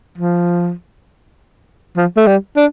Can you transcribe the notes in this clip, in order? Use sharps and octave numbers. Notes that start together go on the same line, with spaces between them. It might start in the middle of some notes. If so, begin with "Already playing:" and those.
F3
F3
A3
G3
D4